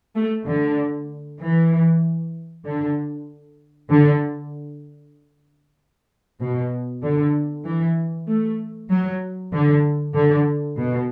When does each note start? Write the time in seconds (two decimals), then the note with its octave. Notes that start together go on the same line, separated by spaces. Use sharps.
0.15 A3
0.46 D3
1.40 E3
2.65 D3
3.90 D3
6.40 B2
7.03 D3
7.65 E3
8.28 A3
8.90 F#3
9.52 D3
10.15 D3
10.78 B2